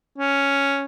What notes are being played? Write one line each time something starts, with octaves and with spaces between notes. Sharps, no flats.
C#4